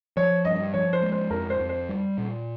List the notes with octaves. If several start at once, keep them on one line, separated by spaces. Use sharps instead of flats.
F3 C#5
G2 D#5
F3 C#5
C5
G#3
C5
F2 A#4
C5
F2
C5
G3
A#2